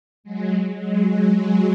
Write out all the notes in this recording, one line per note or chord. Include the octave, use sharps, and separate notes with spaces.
F#3 G#3
F#3 G#3
F#3 G#3
F#3 G#3